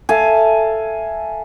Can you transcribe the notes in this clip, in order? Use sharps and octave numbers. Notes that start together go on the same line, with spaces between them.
A4 E5 F5 G#5